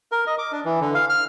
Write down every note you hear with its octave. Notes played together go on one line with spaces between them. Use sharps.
A#4
D#5
D6
D4
E3
D3
F5
F6